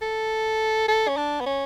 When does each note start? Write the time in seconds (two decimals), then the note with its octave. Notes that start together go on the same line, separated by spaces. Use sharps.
0.01 A4
0.88 A4
1.08 C#4
1.17 D4
1.41 B3
1.46 C#4